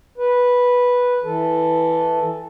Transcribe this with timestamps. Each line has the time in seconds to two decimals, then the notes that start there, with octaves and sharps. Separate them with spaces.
0.18 B4
1.24 E3 A4